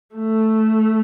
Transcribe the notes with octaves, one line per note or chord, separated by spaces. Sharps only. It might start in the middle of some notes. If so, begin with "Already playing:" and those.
A3